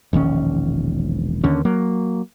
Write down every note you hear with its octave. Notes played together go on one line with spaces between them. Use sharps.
E1 A#1 D#3 C#4
D#2 D3 C#4
F#3 A#3